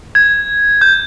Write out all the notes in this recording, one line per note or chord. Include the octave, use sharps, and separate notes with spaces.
G#6
G6